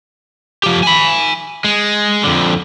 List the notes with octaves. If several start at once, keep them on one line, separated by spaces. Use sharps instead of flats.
F3 G4
G#5 B5
G#3
F2 D3